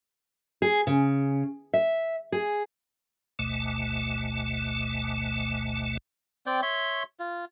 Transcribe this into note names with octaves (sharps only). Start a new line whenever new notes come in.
G#4
C#3
E5
G#4
G#1 D2 B2 A3
C4 D5 G5
C#5 E5 C6 C#6
F4